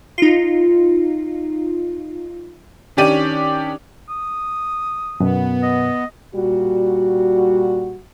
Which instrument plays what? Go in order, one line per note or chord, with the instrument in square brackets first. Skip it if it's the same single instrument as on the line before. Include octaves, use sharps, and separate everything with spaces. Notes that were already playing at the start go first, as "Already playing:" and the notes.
[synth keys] D#4 F4
[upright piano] D#3 C#4 D4 G4 D5 D#7
[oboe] D#6
[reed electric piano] F#2 B2 [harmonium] B3
[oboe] D#5
[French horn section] A#2 G3 F#4